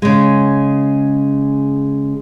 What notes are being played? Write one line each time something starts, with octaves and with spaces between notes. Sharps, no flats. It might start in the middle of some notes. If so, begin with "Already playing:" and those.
C#3 G#3